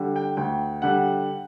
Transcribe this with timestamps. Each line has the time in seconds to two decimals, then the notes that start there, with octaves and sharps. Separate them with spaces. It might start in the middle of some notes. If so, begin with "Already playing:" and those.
Already playing: D3 G3
0.16 G5
0.37 D2 G5
0.82 D3 G3 F#5